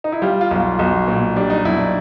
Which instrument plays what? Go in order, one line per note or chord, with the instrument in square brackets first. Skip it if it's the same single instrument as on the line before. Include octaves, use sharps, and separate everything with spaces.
[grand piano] D#4
E4
G3 F4
F4
B1
F4
B1 F#4
A#2
G3 D4
D#4
B1 E4
D4